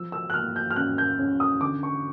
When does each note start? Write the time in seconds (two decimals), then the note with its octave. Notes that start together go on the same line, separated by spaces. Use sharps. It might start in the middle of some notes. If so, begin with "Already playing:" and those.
Already playing: F3 E6
0.12 E6
0.30 F#6
0.34 A#3 F6
0.56 G6
0.70 F6
0.76 C#4 F#6
0.98 G6
1.19 C#4
1.40 D#6
1.61 D3 D6
1.83 C#6